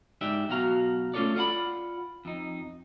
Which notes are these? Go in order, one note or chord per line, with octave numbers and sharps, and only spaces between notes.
G#2 D#4 G4 D5 E5
B2 F#3 F#4 F5 A#5
A3 C#4 F4 A4 C#5 D5
F4 D5 F#5 A5 B5
F2 D#4